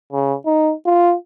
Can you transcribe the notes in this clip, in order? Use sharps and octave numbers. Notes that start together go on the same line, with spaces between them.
C#3
D#4
F4